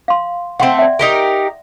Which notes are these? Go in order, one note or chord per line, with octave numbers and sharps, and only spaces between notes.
F5 C6
A3 C4 F#5 G5 C6
D5 E5
D#4 G4 A#4